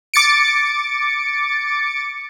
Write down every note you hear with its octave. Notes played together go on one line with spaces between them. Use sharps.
D6 A6 C#7 D7